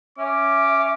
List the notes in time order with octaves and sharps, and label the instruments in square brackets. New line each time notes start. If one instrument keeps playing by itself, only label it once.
[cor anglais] C#4 [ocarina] E5 [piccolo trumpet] D6